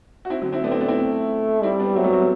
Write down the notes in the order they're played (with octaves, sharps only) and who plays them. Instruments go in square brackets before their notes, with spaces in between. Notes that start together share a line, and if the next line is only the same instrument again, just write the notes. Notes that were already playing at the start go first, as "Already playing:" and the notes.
[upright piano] F#4
C4 E4
D3 F#3
C4 E4
[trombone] A3 [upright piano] B3 D4
[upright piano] C4 E4
B3 D4
C4 E4
[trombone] G3 [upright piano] C4 E4
[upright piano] B3 D4
[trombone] F#3 [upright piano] A3 C4
[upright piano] G3 B3
A3 C4
B3